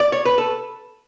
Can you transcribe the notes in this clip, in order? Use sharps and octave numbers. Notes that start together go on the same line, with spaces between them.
D5
C#5
B4
A4